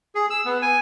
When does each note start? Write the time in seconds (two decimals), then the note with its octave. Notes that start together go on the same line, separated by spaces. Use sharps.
0.15 G#4
0.30 E6
0.45 B3
0.62 G#5